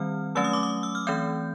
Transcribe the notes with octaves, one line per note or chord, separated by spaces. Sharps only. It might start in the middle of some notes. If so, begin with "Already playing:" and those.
Already playing: D#3 G3 C4 F6
F#3 A3 C#4 E6
D#6
D6
D#6
E6
F6
E3 A3 C4 G6